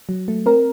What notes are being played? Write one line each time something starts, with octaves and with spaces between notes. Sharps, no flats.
F#3
A3
C4 A#4